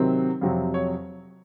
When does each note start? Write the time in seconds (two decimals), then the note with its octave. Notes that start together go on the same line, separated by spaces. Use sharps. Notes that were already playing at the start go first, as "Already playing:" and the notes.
Already playing: C3 D#3 F#3 C4
0.41 F2 C3 F#3 C4
0.74 C#5